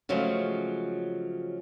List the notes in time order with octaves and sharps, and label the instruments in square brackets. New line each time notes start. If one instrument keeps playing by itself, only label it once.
[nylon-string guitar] C#3 F3 F#3 G#3 A3